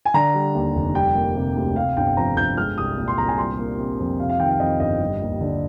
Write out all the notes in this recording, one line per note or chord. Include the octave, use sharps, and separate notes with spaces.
G#5
D3 A#5
G3
D#2
F1
G3 G5
A#3
C3
D2
C3 F5
G1 G5
F2 A#5
G1 G6
G#3 F6
C2 D#6
A#2
C6
C2 A#5
G#5
G3 C6
A#3
C3
F2
C3 F5
F5
D#3 G5
F5
F2 D#5
G1 D#5
G3
D#2
D3